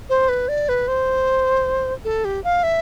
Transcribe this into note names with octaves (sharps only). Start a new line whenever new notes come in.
C5
B4
D5
B4
C5
A4
G4
F5
E5